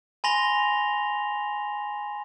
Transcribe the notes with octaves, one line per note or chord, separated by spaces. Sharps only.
G#5 B5 C6 A#6 F7 G7